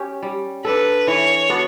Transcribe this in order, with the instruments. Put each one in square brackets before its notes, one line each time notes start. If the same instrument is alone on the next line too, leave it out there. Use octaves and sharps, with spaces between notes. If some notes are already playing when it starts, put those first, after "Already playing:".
Already playing: [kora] C#4 G4
G3
[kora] D4 A4 [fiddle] B4
[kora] E3 [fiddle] C#5
[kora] B3 D4 F#4